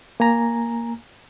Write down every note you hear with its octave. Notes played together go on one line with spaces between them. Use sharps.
A#3 G#5 A#5